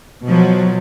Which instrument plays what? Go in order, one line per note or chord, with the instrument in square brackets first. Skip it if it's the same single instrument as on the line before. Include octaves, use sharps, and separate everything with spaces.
[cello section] B2 F3 F#3